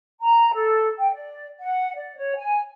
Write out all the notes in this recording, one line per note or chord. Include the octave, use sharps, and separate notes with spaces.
A#5
A4
G5
D5
F#5
D5
C#5
G#5